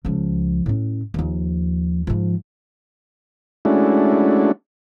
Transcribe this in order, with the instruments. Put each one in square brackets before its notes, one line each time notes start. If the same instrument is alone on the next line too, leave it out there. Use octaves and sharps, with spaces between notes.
[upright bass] C#2 F3
A2 C#4
D#2 F3
G#2 F3
[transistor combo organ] G#3 A3 C#4 D4 E4 F#4